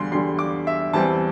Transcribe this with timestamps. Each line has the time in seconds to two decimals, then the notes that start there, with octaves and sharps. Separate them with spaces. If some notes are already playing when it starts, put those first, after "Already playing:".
Already playing: E2 D3 G3 C6
0.11 E2 D3 G3 C6
0.39 D6
0.67 E5
0.93 E2 E3 G3 C4 A5